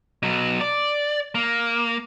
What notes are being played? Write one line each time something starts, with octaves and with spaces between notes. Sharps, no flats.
B2 F#3
D5
A#3